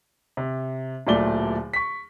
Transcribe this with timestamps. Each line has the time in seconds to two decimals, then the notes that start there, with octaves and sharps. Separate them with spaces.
0.37 C3
1.07 D1 A#2 F#3 A3 D5 G7
1.73 C#6 B6